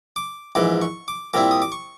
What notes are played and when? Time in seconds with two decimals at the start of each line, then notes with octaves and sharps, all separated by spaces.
0.16 D6
0.55 A#1 G#2 E3 D6
0.82 C#6
1.08 D6
1.33 A#2 G3 C4 E4 D6
1.51 D#6
1.62 D6
1.72 C#6